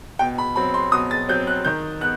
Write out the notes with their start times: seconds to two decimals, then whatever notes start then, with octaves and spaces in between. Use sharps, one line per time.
0.19 B2 G5
0.38 B5
0.56 F#3 C4 B5
0.74 C6
0.92 B2 D#6
1.11 A6
1.29 F#3 C4 G6
1.47 F#6
1.65 D#3 G6
2.01 B3 F#6